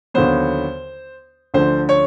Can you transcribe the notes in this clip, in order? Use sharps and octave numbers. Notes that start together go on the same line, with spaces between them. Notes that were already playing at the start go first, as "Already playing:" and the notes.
D#2 D3 F#3 B3 C5
D2 D3 F3 A3 C5
C#5